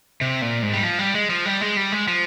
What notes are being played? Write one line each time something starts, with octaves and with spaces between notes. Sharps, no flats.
C3
A#2
G#2
G3
F3
G3
G#3
F3
G3
G#3
G3
G#3
F3